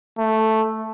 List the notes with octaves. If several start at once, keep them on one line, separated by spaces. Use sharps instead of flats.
A3